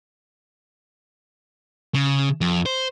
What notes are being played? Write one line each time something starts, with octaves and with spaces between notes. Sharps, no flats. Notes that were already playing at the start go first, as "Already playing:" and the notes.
C#3
F2
C5